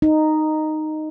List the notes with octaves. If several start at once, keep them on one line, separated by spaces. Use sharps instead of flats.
D#4